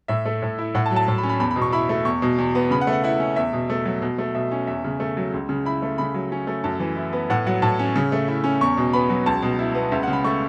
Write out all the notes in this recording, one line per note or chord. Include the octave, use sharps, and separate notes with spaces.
A2 E5
A3
A2
E4
A2 F#5
A5
F#3
A5
A2
B5
C#4
B5
E2 B5
B5
B2
C#6
E4 B5
A3
E2 C#6
B2
E2
B3
C#3 B5
F#5
A3
F#5
E4 F#5
C#4
E2 E5
B2
A3
F#3
B2
A3
B2 E5
C#4
E2 E5
C#3
A3
F#3
C#2
C#3
E4 B5
A3
C#3 B5
F#3
C#4
A3
F#2 A5
E3
E4
B3
A2 F#5
F#3 F#5
A2 A5
C#4
C#3
A3
E4
C#4
E2 C#6
B2
B3 B5
F#3
C#2 A5
B2
E4
B3
C#2 E5
F#5
C#3
B5
A3 C#6